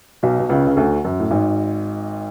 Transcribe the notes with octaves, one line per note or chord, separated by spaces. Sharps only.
B1 B2
B2
C#2 C#3
C#3
D2 D3
F#2
A2
G#1 G#2